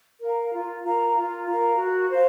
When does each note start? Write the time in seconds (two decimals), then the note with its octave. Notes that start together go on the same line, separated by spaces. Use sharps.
0.21 A#4 F5 A#5
0.53 F4
0.84 A#4 F5 A#5
1.15 F4
1.46 A#4 F5 A#5
1.77 F#4
2.09 C5 F5